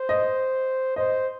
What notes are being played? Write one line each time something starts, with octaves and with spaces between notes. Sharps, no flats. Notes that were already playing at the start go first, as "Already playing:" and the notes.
Already playing: C5
D#5
C5 D#5